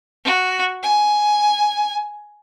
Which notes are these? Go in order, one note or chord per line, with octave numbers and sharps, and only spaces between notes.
F#4
G#5